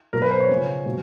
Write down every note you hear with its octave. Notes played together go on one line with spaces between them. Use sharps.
B2 F#3 A#4
B4
C5
C#5
C#3 F3
B2 F#3